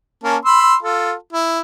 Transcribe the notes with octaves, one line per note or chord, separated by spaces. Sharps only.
A#3 C#4 A5
B5 C6 E6
F4 A4
E4